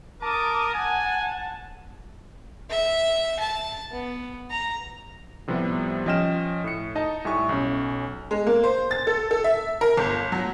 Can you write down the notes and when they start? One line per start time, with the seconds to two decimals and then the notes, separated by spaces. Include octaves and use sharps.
0.22 A#4 A5 D6 D#6
0.74 F#5 G#5
2.70 E5
3.40 A5
3.92 B3
4.51 A#5
5.48 A2 C3 F3 G3 B3
6.06 F3 C#4 D#5 G5 F6 E7
6.64 A2 C#7
6.95 D#4 D#5 A5
7.25 A2 G3 E5 G#5 C#6
7.49 B1 C#4
8.31 G#3
8.47 A#3
8.64 C5
8.91 A6
9.07 A4
9.31 A4
9.44 E5
9.81 A#4
9.97 G1
10.32 F#3